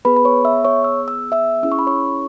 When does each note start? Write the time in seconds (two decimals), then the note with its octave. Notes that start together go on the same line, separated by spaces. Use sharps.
0.05 B3 G#4 B4 B5
0.16 B5
0.25 C#5 C#6
0.45 E5 E6
0.64 C#5 C#6
0.84 E6
1.08 E6
1.32 E5 E6
1.63 C#4 E4 G#4 E6
1.72 C#6
1.79 B5
1.87 C#5 C#6